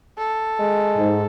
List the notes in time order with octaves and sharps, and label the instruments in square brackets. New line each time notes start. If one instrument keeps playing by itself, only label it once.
[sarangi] A4
[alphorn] G#3
[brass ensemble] G#2